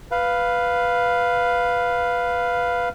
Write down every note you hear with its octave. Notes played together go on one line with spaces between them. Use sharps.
B4 F5